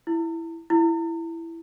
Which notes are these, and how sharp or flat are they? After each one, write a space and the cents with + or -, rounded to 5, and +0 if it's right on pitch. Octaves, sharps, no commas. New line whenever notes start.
E4 +5
E4 +10